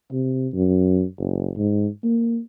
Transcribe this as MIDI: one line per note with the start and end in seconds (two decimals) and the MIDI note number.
0.12 0.48 48
0.54 1.04 42
1.19 1.51 30
1.57 1.88 44
2.04 2.39 58